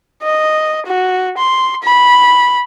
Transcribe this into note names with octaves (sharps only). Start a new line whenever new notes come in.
D#5
F#4
C6
B5